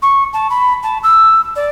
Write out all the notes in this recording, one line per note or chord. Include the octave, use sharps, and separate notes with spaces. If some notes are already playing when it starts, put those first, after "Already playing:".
C#6
A5
B5
A5
E6
D5